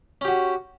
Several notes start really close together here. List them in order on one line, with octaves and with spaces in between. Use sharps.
C#4 G4 F#4